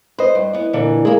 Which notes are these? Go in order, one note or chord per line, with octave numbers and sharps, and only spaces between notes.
B4 C5 D#5
G2
B3 E4
A#2 D3 E3
G#3 A#3 E4 G#4